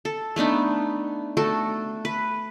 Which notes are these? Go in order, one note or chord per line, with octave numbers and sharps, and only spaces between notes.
A4
A3 B3 D4 D#4
A3 F#4 A4
B4